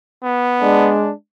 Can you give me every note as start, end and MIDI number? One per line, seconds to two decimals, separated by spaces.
0.23 0.94 59
0.61 1.11 56
0.61 1.11 62